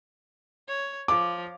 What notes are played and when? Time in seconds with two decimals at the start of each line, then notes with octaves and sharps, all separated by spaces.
0.68 C#5
1.08 F3 D6